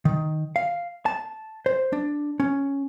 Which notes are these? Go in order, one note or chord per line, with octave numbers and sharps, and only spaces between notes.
D#3
F5
A5
C5
D4
C#4